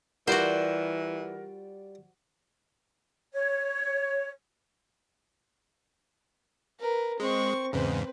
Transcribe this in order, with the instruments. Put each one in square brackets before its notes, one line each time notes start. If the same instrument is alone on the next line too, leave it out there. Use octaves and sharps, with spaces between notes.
[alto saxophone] E3 [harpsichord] G3 F4 D5 [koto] F#4 C5 [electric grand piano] A#4 F#5
[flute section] C#5
[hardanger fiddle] A#4 B4
[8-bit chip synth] G#3 [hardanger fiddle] C4 C#6
[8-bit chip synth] E2 G#2 C#3 [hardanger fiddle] C4 B4